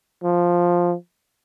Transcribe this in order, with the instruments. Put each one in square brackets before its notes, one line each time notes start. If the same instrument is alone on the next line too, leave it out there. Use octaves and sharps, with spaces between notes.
[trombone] F3